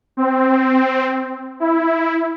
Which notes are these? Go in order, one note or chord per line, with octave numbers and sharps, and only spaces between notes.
C4
E4